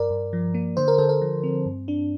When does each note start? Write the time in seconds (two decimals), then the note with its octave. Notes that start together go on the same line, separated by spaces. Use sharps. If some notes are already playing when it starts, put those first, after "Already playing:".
Already playing: G2 A#4 D5
0.10 G2
0.33 F3
0.54 A#3
0.77 D3 C5
0.88 A#4
0.98 D3 A4
1.09 A#4
1.22 F3
1.43 C4
1.66 G2
1.88 D4